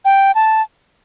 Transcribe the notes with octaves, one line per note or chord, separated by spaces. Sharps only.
G5
A5